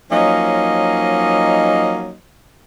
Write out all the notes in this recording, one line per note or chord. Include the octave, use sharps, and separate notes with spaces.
F3 F#3 A#3 C#4 D#4 D#5